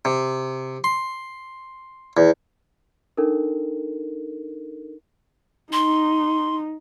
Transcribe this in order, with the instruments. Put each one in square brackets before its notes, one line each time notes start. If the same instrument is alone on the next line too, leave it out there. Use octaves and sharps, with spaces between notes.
[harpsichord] C3
C6
E2
[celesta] D4 D#4 A4 A#4
[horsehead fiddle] D#4 [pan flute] C6